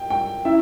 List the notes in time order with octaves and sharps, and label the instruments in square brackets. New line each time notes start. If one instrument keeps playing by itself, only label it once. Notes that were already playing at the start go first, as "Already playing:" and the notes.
Already playing: [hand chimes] G4 A#4 D#5 [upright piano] G5
[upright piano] G5
[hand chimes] C#4 E4 [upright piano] E5